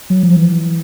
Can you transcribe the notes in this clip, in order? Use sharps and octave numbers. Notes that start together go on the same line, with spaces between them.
F#3
F3
E3